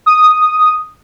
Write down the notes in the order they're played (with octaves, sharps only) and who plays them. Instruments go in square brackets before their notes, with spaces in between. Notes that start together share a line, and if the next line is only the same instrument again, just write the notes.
[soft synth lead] D#6